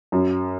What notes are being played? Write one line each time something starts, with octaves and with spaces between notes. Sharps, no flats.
F#2